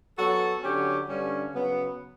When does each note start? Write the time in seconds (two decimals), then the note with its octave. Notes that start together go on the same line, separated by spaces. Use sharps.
0.17 F#3 B3 F#4 A4
0.62 D3 F#3 C#4 G4
1.08 G2 D3 G3 C#4
1.52 C#3 F#3 B3